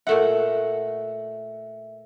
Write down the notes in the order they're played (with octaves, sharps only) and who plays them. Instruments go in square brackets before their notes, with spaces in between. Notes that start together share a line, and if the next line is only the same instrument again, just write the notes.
[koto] A#2 A3 F#5 [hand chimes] E5